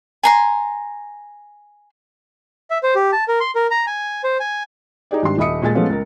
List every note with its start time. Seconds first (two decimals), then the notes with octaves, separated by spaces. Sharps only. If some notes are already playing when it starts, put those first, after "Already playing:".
0.23 G#5 A#5 C6
2.70 E5
2.83 C5
2.95 G4
3.12 A5
3.28 A#4
3.40 C6
3.55 A#4
3.71 A#5
3.87 G#5
4.24 C5
4.40 G#5
5.11 D#4 G4 G#4 D5
5.22 G#1 G3 D4 C6
5.38 D#1 D#5 E5 B5 D#6 C#7
5.62 A#2 G#3 G#5 A6
5.75 F3 G#3 A3 B3 C#4 F4
5.89 C#2 A#4